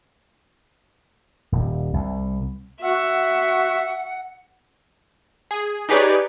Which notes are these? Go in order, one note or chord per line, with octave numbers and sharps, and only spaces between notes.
D#1
C2
F#4 E5 F#5
G#4
D#4 G4 G#4 B4 C#5 D5